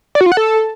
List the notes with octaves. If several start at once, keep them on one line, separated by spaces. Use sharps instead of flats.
D5
F#4
F4
F#5
A4